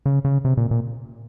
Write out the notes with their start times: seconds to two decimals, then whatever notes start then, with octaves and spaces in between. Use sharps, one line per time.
0.06 C#3
0.25 C#3
0.45 C3
0.57 A#2
0.71 A#2